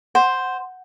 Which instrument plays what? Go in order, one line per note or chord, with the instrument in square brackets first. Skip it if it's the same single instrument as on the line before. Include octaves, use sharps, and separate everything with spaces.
[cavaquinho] C5 [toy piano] F#5